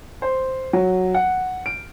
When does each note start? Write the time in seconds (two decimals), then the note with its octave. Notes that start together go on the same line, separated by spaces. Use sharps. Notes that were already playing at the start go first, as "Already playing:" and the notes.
0.22 C5
0.73 F#3
1.15 F#5
1.66 D7